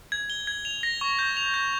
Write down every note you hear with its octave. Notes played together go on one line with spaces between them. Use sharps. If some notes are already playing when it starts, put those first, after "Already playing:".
G#6
G7
G#6
F7
A#6
C#6
G6
F7
G6